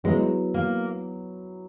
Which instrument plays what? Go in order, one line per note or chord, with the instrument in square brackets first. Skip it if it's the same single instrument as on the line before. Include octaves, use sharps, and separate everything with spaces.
[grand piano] F#3 B3 E4 [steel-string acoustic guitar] G#3
[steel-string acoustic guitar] A#3